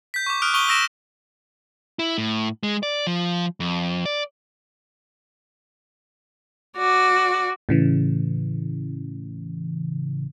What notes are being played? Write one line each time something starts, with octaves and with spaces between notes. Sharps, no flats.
G6 B6
C#6 D6
D#6 F6 F#6 D7
C#6 D#6 D#7 G7
C#6 D#6 E6 A#6 D7 E7
E4
A2
G#3
D5
F3
F2
D5
F#4 D5
A2 C#3 E3